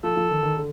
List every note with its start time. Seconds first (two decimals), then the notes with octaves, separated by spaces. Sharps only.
0.03 F3 A4
0.16 F3
0.31 D#3
0.43 D#3
0.57 D3